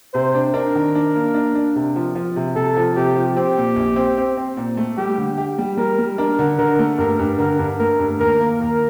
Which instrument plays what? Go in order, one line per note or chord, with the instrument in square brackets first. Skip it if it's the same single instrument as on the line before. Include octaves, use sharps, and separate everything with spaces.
[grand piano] C3 [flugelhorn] C5
[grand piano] D4
[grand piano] D4 [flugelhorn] A#4
[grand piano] D#3
D4
A#3
D4
D4
C3
F3
F3
C3
[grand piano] C3 [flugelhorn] A4
[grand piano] F3
[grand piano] C3 [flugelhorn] G4
[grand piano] F3
[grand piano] C4 [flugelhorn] G4
[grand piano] A#2
A#1
C4
C4
C4
A#2
A3
[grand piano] G3 [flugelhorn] G4
[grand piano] D3
G4
G3
[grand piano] G3 [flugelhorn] A#4
[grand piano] G3
[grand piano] D4 [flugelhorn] A#4
[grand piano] D3
[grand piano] D3 [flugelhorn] A#4
[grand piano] A3
[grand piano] G2 [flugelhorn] A#4
[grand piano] G2
[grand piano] D3 [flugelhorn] A#4
[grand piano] G2
[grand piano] A3 [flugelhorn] A#4
[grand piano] G2
[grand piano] D#2 [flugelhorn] A#4
[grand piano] A#3
[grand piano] D#2 [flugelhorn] A#4